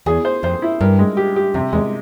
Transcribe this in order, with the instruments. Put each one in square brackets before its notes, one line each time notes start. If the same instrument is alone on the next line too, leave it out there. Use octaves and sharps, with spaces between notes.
[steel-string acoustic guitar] E2 [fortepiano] G#4
[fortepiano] C5
[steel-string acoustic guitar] F2 [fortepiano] C5
[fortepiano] E4
[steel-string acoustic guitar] G2 [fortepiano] A#4
[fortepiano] G#3
G4
G4
[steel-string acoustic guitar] F2 [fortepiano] C3
[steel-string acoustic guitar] E2 [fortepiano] G#3